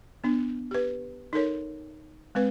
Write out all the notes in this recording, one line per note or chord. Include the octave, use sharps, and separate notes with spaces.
B3 D4
G4 B4
D#4 A4 A#4 C#5
G#3 C4 B4